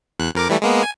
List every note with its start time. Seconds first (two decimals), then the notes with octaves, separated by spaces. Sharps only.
0.19 E2 F#6
0.35 F2 A#4 D6
0.49 E3 G3 A3
0.62 G#3 A#3 B3
0.83 G#5